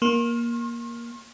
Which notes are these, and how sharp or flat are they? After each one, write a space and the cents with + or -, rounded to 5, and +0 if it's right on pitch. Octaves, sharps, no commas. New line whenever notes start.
A#3 +15 C6 +45